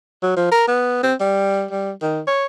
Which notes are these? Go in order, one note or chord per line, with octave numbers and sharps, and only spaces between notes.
F#3
F3
A#4
B3
C4
G3
G3
D#3
C#5